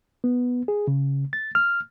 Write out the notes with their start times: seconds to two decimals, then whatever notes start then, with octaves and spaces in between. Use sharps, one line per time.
0.24 B3
0.68 G#4
0.88 C#3
1.33 A6
1.55 F6